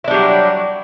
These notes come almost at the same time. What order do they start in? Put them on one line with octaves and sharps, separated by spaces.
E4 D4 G3 F#3